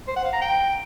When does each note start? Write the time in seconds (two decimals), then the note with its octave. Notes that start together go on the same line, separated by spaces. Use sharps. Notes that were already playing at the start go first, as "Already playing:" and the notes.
0.08 C5
0.16 F#5
0.25 F5
0.33 A#5
0.41 G5